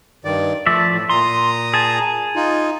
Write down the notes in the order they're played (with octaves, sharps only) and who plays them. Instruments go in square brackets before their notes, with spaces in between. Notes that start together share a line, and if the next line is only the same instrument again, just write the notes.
[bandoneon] G2 D#3 D5
[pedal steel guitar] F3 D5 E5 [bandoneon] A3
[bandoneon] A2
[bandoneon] A#2 A#5 D#6 [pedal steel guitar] C6
[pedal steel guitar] G#4 A5
[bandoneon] D#4 F4